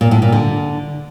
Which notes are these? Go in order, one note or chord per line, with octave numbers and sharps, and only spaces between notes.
A#2
A2
A#2
D3